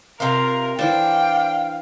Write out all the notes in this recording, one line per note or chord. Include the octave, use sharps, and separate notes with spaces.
C3 F4 A#4
E3 D4 C5 F5 G5 A5